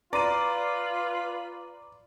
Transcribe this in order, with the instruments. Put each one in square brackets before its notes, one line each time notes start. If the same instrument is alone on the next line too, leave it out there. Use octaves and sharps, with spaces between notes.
[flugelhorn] F4 [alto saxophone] B4 [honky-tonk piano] D5 [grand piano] A#5 C6 D#7